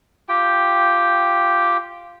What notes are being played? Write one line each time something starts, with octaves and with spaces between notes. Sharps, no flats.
F4 G4 G5